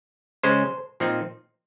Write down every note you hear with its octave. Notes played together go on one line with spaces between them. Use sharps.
C#3 G#3 C#4 C5
A#2 F3 C4 D#4